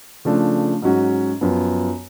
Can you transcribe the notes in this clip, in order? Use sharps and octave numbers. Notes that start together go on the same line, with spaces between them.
C#3 F3 A3 D4
G#2 F#3 C#4 F#4
F#2 F3 B3